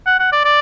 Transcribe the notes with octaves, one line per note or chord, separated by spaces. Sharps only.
F#5
F#5
D5
D5